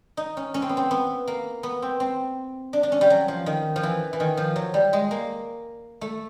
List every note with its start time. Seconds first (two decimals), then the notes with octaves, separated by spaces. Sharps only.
0.17 D#4
0.37 C#4
0.54 C#4
0.62 C4
0.69 B3
0.77 C4
0.91 B3
1.28 A#3
1.63 B3
1.82 C4
2.00 C4
2.73 D4
2.83 D4
2.92 C#4
3.01 G3
3.10 F#3
3.28 F3
3.46 D#3
3.76 F3
3.83 E3
4.13 E3
4.20 D#3
4.37 F3
4.56 F#3
4.74 G3
4.93 G#3
5.11 A#3
6.01 A3